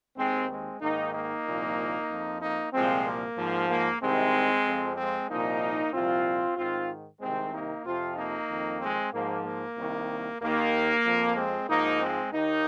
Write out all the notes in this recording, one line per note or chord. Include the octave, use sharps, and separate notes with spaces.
D#2 D#3 G#3 C4
G#3 C4
G#2 D#3 A#3 D#4
A#3 D#4
C2 A#2 F3
F2 F3
A#3 D#4
C2 A#2 F3 G#3 C4
A#3
G#2 F3
A#3
C2 C3 D#3 G#3 C4
F2 F3
G#3 C4
C2 A#2 F3 A#3 D#4
C2 A#2 F3 C4 F4
G#2 D#3 C4 F4
C2 C3 D#3 G#3 C4
A#3 D#4
F2 C3 F3 C4 F4
A#3 D#4
F2 D#3
G#3 C4
G#2 F3 A#3
A#3
C2 C3 D#3
D#2 D#3 A#3
F2 F3
G#3 C4
G#2 F3 A#3 D#4
G#3 C4
D#2 D#3 A#3 D#4